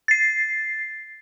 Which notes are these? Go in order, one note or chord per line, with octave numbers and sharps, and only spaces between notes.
A6 C7